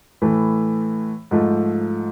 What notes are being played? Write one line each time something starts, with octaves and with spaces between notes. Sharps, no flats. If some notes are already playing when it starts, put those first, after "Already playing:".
A2 E3 A3
G#2 F3 A3